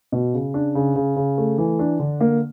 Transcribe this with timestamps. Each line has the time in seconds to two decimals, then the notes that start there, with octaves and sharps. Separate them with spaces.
0.12 B2
0.34 C#3
0.54 D4
0.75 C#3
0.96 C#3
1.16 C#3
1.38 A3
1.58 E3
1.79 D4
2.00 D3
2.21 A#3